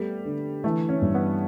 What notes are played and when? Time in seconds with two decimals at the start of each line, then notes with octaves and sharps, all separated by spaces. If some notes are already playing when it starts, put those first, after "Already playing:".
Already playing: G3 A3 B3
0.25 D3
0.64 E3 A3
0.89 C#4
1.02 G2
1.14 B3